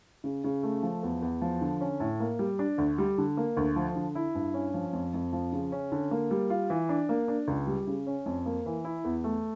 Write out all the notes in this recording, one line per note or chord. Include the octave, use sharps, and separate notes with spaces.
C#3
C#3
A3
F3
E2
E2
F3
D3
C#4
A2
A#3
G3
D4
D2
G3
D3
A#3
D2
F3
D3
E4
G2
C#4
F3
F2
F2
F3
C#3
C#4
D3
A#3
G3
F4
E3
D4
A#3
D4
C#2
G3
C#3
C#4
F2
A#3
E3
E4
E2
A3